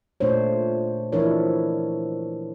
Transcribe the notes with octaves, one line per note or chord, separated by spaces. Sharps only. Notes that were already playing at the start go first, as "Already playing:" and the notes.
A#2 A3 D4 C5 C#5
E3 F3 D4 E4 A#4 C#5